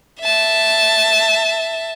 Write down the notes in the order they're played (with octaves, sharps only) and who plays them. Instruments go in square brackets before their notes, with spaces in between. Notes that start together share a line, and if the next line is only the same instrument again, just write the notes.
[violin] E5 A5